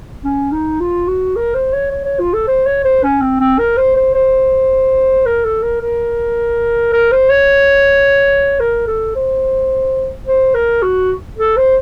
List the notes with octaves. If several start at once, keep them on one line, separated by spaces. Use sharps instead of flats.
C#4
D#4
F4
F#4
A#4
C5
C#5
C#5
C#5
F4
A4
C5
C#5
C5
C#4
C4
C4
A#4
C5
C5
C5
A#4
A4
A#4
A#4
A#4
C5
C#5
A#4
A4
C5
C5
A#4
F#4
A4
C5